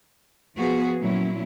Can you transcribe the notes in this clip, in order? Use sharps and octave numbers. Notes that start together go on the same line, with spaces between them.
F3 B3 F#4 G#4
A#2 F#3 C#4 E4